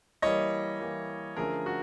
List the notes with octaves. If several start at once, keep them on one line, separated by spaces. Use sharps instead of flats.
E3 G3 A#3 C#5 D#5
E3 G3 A#3
D3 F3 A3 C#4 G#4 A#4
F#4